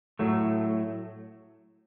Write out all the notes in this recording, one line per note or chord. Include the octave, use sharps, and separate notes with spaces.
A2 F#3 A3